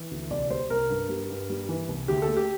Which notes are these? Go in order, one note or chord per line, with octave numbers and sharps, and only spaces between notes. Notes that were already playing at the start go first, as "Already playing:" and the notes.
Already playing: E3
D2
C2 D5
G3 C5
C2 A#4
G2
G3
G2
G3
E3
C2
D2 G4
A4
A3
G4